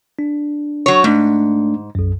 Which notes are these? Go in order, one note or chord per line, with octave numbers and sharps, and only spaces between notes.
D4
F#3 C#5
G#2 A3 D4
B1 F#2